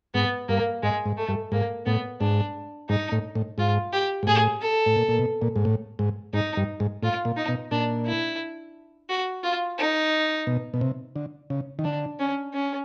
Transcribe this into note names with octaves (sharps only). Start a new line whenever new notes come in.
G#2 B3
G2 A#3
G#2 G#3
G#2
A3
G2
G#2 A#3
A2 B3
G#2 D4
G#2 D#4
A2
A2
G#2 F4
G4
G#2
A2 G#4
A4
A2
A#2
A#2
B2
A#2
G#2
A2
G#2
G#2 D#4
G2
G#2
A2 F4
A#2
D#4
B2
A#2 D4
E4
F#4
F4
D#4
B2
B2
C3
D3
C#3
D#3
D3 D4
C#4
C#4